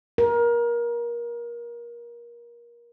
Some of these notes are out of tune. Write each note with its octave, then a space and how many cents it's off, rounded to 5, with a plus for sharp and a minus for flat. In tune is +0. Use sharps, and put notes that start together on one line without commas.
A#4 +25